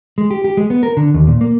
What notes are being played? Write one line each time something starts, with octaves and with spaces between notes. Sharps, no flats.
G#3
G4
G4
G#3
B3
A#4
D3
D#2
A#2
A#3